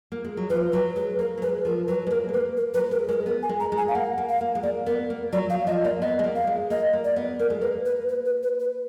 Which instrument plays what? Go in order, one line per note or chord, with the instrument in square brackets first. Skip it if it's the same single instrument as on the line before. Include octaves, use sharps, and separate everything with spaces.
[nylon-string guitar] A#3
G#3
F#3
[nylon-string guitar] F3 [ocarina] B4
[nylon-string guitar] F#3 [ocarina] B4
[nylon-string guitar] G#3 [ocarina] B4
[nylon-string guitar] A#3 [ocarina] A#4
[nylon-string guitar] F#3
[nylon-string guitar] G#3 [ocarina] B4
[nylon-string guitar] F3 [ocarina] A#4
[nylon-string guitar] F#3 [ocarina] B4
[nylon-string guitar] G#3
[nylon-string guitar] A#3 [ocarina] A#4
[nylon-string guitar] G#3
[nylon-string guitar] A#3 [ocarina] B4
[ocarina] A#4
[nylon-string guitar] F#3 [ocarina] B4
[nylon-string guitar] G#3 [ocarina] A#4
[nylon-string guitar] G#3 [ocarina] A#4
[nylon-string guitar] B3 [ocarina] A#4
[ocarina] G#5
[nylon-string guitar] G#3
[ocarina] A#5
[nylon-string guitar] G#3
[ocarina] G#5
F5
[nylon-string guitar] A#3 [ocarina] F#5
[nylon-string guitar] A#3
[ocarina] F5
[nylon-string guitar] A#3
G#3
[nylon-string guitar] A#3 [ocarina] D5
[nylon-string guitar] B3 [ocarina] A#4
[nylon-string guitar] A#3
[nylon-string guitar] F#3 [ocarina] D5
[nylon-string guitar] F#3 [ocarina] F5
[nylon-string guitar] F3 [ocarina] D#5
[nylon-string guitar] A#3 [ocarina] D5
[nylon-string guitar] B3 [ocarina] D#5
[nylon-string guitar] G#3
A#3
[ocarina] F5
[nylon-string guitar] G#3
[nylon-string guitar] A#3 [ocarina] D#5
[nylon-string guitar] A#3
[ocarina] D5
[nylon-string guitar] B3
[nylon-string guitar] A#3 [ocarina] A#4
[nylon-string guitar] G#3
[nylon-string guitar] A#3 [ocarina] B4
[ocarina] B4
B4
B4
B4
B4